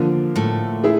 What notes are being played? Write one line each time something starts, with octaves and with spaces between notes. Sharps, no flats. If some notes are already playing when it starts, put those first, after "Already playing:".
Already playing: D3 F3 A#3
A2 A3
E4 G#4